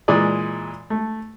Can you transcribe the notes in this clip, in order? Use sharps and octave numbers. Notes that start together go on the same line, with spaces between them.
A#2 E3 G#3 D5
A3